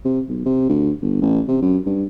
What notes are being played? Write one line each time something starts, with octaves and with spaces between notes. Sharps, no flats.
C3
B1
C3
D2
G1
A1
C3
F#2
G2